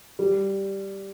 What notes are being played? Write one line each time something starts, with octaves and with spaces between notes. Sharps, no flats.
G3